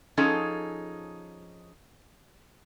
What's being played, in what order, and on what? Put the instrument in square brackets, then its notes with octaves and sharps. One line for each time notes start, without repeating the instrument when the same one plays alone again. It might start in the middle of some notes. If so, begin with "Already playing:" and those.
[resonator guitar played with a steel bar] F3 C#4 D#4 G#4 A4